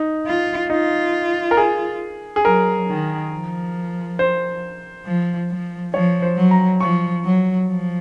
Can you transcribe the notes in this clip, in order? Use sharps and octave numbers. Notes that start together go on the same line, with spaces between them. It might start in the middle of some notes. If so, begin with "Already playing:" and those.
Already playing: D#4
F4
D#4 F4
A#4
G#4
G#4
F#3 A#4
D#3
F3
C5
F3
F3
F3 C#5
C5
F#3
A#5
F3 C#6
F#3
F3